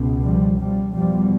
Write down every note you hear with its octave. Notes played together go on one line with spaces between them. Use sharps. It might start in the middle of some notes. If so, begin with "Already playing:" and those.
Already playing: C#2 B2
F3 G3
F3 G3
E2 B2 F3 G3